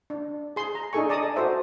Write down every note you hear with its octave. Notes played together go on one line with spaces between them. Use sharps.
D4
G#4 C6
A#5
D4 D#4 G#4 A4 G#5 C#6
D5 A5 A#5 D#6
F#4 A4 C5 E5